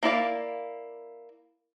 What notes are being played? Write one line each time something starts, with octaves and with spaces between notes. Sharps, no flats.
A#3 E4 D5 F5